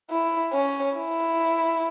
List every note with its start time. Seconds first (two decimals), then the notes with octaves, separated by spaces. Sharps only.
0.10 E4
0.54 C#4
0.97 E4